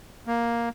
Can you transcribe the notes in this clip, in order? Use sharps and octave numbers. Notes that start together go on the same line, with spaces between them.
A#3